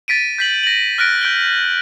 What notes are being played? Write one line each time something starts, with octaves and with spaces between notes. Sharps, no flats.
A6 B6 D7 D#7
G6 B6 F#7
A#6 F#7
F6 F#6 A#6 D7
G6 D7 G7